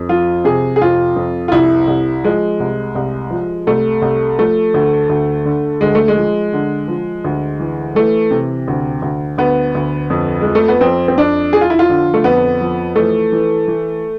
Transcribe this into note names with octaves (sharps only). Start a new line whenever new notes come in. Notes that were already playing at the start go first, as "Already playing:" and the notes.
Already playing: F2
F3 F4
C3 G#4
G#4
F2 F4
F2
F4
C2 E4
C2
F3 G#3
C2
C2
F3
C2 A3
C2
F3 A3
D2
D2
D3
D2 G#3
A3
G#3
F3
D3
F3
D2
E3
E3 A3
C3
D2
D2
D2 B3
D2
F2
G#3
F3
A3
B3
F2 C4
C4
F2 D4
F3 G#4
F4
E4
F4
D3
A3
F2 B3
F3
E3 A3
E3
E3